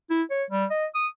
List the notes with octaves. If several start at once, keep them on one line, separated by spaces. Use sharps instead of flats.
E4
C#5
G3
D#5
D#6